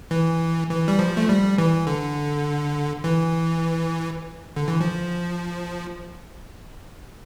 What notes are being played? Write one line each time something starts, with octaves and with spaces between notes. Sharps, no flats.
E3
E3
G3
F3
A3
G3
E3
D3
E3
D3
E3
F3